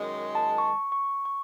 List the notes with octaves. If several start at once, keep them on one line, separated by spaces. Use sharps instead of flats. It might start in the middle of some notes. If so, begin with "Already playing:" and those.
Already playing: F#2 D#3 G#3
A5
C#6
C#6
C#6